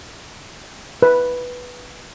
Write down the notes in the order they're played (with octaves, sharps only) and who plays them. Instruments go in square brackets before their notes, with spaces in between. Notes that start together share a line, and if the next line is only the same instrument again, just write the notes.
[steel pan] B4